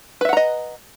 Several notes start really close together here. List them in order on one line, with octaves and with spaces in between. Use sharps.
B4 E5 F#5 A#5 D#5